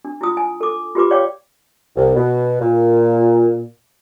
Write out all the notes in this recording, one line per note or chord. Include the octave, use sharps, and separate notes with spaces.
D4
E4 F4 D#6
G#5
A4 D6
F4 G4 B4 D6
C#5 D5 F5 G5 C#6 D6
C2
B2
A#2